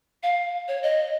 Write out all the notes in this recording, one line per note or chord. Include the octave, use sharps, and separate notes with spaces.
F5
C#5
D#5